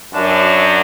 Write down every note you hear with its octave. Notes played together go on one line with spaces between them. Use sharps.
F#2 D4